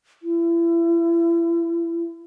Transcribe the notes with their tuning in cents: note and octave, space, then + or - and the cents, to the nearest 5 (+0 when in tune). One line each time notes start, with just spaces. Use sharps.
E4 +35